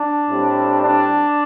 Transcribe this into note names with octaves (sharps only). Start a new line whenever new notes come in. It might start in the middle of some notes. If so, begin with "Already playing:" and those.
Already playing: D4
A2 G3 C4
D4